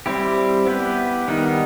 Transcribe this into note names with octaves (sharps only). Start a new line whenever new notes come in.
G3 C4 E4 G4
B3 E4 G4 B4
D#3 G3 B3 D#4